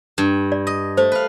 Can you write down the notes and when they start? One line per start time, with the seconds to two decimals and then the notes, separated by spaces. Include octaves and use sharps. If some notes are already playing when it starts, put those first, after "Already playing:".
0.18 G2
0.52 D5
0.67 D#5
0.97 A3 C5
1.12 B4 F5